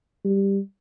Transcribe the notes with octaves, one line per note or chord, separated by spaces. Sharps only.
G3